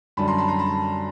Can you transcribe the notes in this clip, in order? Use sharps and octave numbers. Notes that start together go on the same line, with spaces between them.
F#2 D3 G3 A5 B5
A#5 C6
A5 B5
A#5 C6
A5 B5